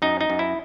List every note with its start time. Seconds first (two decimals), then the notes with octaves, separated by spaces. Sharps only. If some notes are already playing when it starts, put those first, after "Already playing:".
0.02 F#2 D#4
0.21 D#4
0.30 F#2
0.39 E4